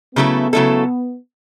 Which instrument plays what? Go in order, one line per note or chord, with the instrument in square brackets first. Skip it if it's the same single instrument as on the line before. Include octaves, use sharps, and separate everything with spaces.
[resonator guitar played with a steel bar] C#3 F#3 A3 E4 A4 [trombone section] B3
[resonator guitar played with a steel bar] C#3 F#3 A3 E4 A4